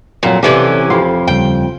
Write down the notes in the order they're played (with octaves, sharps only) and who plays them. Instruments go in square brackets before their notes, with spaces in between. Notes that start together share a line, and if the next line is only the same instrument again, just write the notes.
[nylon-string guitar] F2 F#3 [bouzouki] A#2 [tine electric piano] C#5 F5 G#5
[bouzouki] C3 E3 C#4 [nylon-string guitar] A4 C5 D5 [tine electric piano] F#5 D6
[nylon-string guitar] F2 F4 F5 [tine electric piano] B5 C6
[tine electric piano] D#2 C#3 G3 [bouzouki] G5